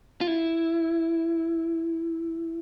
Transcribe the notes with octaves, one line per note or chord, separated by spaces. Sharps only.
F4
E4